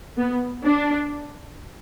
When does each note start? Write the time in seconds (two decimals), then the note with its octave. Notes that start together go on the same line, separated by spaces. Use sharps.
0.17 B3
0.63 D4